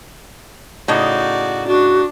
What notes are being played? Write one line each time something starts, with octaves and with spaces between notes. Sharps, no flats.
A2 C#3 D#4 F#4 D5
D4 F#4